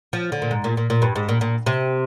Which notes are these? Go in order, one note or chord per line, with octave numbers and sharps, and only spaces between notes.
F3
D3
A#2
G#2
A#2
A#2
A#2
G2
G#2
A#2
A#2
C3